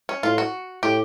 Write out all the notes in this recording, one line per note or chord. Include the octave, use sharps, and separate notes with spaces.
C#4
A2 F4
F#4
A2 G4